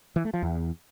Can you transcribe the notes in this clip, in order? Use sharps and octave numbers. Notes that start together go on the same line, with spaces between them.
E3
A3
F3
E2